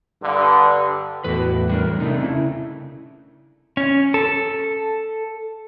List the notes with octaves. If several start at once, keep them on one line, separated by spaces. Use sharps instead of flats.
G2 D3
E2 A2 A3 F#4 B4
G3 D4 A#4
C3 A3 D4 D#4
C#3 E4
C#4
A4